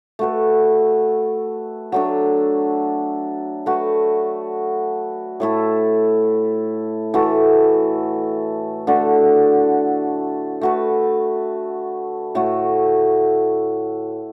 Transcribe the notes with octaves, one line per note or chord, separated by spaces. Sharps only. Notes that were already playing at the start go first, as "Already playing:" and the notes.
A3 F#4 B4
F#3 A3 D4
A3 F#4 B4
A2 A3 E4 A4
E3 A3 F#4 A4
D3 A3 F#4 A4
A3 F#4 B4
A2 A3 F#4